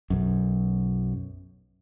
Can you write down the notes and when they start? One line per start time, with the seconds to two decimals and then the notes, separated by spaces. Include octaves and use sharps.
0.10 B1 F#2